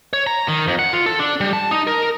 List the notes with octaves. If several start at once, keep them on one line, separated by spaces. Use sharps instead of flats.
C#5
A#5
D#3
F2
F#5
F4
A4
D4
G3
A5
D#4
A#4